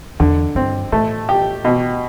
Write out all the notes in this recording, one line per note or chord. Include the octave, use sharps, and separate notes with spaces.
E2 D3
G2 C4
A2 A3
G4
B2